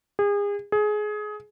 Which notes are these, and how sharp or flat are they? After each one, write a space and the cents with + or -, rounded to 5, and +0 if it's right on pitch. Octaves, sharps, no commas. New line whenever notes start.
G#4 -35
G#4 +20